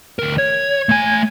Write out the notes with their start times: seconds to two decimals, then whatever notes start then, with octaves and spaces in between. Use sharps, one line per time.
0.19 D2 A#4
0.38 C#5 G#6
0.89 A3 G#5